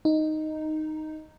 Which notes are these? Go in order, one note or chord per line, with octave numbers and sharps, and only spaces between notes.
D#4